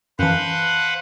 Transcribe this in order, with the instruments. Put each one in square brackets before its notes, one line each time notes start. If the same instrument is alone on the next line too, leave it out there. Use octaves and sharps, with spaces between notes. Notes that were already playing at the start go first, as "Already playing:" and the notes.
[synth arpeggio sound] F#2 E3 [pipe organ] B4 C5 F#5 [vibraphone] F5 A5